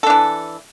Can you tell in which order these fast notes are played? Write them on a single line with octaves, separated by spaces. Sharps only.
A4 D4 E3